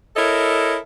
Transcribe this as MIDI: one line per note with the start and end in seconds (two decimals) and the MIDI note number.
0.17 0.77 64
0.17 0.77 69
0.17 0.77 70
0.17 0.77 73
0.17 0.77 75